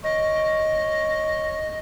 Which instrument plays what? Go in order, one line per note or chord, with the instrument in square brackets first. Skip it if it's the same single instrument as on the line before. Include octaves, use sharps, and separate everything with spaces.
[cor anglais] C#5 [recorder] D#5